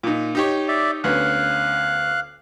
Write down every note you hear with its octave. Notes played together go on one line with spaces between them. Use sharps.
A#2 D#4
D#4 G4 C#5
D5 E5
D2 B3 C#4 F5 F#6